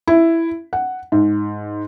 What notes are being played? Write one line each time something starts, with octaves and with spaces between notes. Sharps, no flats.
E4
F#5
G#2